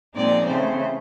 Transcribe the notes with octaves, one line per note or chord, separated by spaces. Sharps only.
A#2 F3 G#3 C4 D#4 D5
C#3 E3 A3 C4 C5